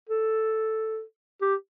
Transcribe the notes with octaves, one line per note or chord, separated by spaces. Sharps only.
A4
G4